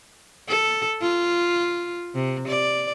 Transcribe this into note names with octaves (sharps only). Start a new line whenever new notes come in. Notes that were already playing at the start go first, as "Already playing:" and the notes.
A4
F4
C3
D5